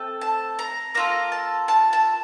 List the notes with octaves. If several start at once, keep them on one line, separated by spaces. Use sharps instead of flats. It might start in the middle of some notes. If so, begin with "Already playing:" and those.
Already playing: A3 C4 A4
A5
A#5
A#3 F4 A4 A#5
A5
A5
A5